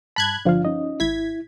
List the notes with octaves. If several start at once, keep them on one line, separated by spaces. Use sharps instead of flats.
G2 A5 B5 F#6 G#6
G1 F3 D4 F4 F5
C#4 D#4 D#5
G#1 E4 G#6 B6